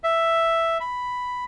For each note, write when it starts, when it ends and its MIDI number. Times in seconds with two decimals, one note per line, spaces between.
0.04 0.78 76
0.80 1.44 83